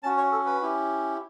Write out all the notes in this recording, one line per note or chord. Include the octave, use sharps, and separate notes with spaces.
C#4 F#4 A5
C#5
A4
B4
C#4 E4 G4